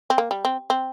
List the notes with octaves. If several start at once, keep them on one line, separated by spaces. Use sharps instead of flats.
C4
A#3
G3
C4
C4